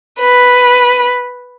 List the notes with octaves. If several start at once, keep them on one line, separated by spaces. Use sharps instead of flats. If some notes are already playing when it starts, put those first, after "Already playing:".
B4